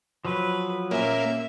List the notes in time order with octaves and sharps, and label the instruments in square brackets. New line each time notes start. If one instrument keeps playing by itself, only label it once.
[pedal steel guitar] F3 F#3 [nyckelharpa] B4
[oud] A#2 C#4 [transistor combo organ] A#3 [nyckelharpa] E5